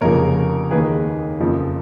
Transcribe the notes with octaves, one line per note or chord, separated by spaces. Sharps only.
F1 F2 C#3 F3 A#3 A#4 C#5
D#2 D#3 A#3 G#4 B4
F#1 F2 F3 A#3